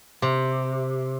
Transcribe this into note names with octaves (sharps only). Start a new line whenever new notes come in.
C3